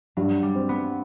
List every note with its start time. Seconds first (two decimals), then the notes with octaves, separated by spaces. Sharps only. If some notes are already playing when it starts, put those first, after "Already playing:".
0.17 G2 F#3
0.43 G3
0.55 C4
0.69 B3